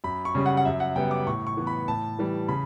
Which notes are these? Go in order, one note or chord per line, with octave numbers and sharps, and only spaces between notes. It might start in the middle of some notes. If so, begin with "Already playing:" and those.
F#2 B5
C#6
C#3 G3 C#4
F#5
F#5
F#2 E5
F#5
C#3 G3 B3 G5
D6
A2 C#6
C#6
E3 B3
B5
A2 A5
E3 G3
C#3 B5